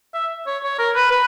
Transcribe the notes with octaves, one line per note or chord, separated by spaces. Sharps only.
E5
C#5
C#5
A#4
B4
B4